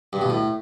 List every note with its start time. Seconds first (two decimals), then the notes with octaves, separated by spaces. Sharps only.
0.13 G2
0.21 B2
0.30 A2